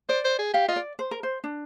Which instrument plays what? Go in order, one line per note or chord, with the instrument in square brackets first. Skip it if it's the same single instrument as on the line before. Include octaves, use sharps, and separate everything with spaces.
[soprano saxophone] C5 [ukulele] D5
[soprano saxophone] C5
G#4
[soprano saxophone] G4 [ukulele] F5
[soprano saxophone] F4 [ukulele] D#5
[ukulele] D5
C5
A#4
C5
D4